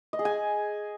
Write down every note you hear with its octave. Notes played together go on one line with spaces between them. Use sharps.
D#5
G#4
G#5